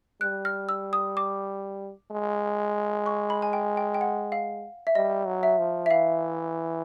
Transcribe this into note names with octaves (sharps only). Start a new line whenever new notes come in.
G3 F#6
F6
E6
D#6
D6
G#3
C#6
B5
G#5
G5
G5
G5
F#5
F5
E5
G3 D#5
F#3
E5
F3
E5
E3 F5